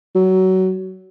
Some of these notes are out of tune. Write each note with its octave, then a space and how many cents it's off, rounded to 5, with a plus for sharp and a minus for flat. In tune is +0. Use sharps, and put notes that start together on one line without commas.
F#3 +20